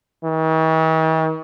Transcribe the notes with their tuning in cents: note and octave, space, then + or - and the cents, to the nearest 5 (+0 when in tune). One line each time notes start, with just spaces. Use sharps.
D#3 +45